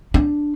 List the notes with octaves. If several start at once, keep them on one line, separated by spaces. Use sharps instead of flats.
D4